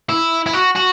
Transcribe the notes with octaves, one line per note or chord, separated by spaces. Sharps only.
E4
E4
F#4
F#4